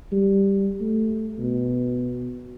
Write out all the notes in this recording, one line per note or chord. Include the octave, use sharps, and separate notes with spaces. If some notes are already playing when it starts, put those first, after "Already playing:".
G3
A3
B2